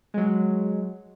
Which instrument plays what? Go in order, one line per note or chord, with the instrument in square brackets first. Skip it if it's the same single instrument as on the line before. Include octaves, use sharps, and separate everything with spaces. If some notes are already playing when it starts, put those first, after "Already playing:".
[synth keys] F#3 G#3